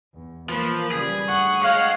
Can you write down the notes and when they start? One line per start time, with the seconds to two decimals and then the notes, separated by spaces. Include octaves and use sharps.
0.14 E2
0.49 E3 F3 A#3 B4
0.91 C#3 G3 G#4
1.28 D2 F#5 C#6
1.64 G#3 C#5 F5 F#5